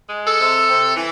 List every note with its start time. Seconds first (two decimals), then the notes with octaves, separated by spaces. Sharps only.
0.09 G#3
0.25 A4
0.39 C3
0.68 C3
0.97 E3